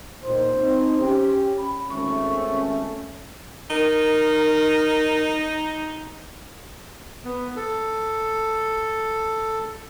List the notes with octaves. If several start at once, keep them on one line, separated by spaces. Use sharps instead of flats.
A#2 D#3 D#4 C5
C4 D#4
C#4 G4
B5
G#1 A3 C#4 C#6
D#4 A#4
B3
A4